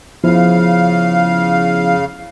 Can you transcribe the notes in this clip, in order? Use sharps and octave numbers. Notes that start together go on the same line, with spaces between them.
C#3 F3 B3 E4 F5